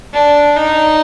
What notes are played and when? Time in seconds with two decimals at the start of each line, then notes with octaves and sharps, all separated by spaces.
0.13 D4
0.56 D#4